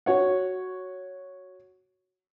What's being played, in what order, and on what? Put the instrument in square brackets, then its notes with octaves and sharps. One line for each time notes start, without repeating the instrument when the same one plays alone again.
[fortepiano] F#4 C#5 F#5